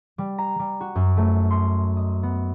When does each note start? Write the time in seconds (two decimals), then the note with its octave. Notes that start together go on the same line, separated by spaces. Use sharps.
0.18 G3
0.38 A#5
0.59 G3
0.81 F#4
0.95 F#2
1.17 A3
1.50 C6
1.97 D#5
2.23 B3